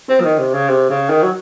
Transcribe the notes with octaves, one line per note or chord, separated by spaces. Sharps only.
C4
F3
D#3
C3
C#3
C3
C#3
D#3
F#3